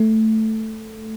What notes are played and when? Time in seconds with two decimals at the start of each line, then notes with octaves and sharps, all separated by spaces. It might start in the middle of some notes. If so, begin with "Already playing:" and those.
Already playing: A3